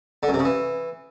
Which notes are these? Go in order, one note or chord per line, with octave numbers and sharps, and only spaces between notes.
D3
F#2
C3
C#3
E3